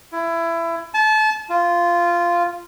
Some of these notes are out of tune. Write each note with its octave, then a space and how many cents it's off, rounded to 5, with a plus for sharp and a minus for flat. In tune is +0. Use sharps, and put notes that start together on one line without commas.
E4 +20
A5 -30
F4 -10